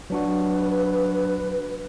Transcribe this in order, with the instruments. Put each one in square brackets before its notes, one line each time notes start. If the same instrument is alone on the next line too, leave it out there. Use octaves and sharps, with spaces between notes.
[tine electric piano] F#3 D4 F#4 [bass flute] B4